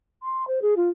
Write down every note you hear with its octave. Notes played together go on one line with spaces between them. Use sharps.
C6
C5
G#4
F4